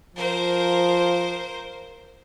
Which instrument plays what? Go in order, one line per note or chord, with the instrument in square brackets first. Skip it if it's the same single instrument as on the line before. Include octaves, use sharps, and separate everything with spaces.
[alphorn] F3 [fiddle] A#4 C5